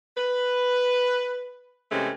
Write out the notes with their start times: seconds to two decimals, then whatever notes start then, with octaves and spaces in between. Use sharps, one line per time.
0.18 B4
1.91 C3 E3 G#3 A3 C4 C#4